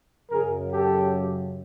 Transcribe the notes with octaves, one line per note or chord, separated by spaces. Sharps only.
F#2 C#3 F#3 G#4 A#4
G4 A4